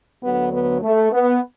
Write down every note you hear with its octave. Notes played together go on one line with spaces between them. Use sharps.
D2 D3 F#3 B3
B3
A3
B3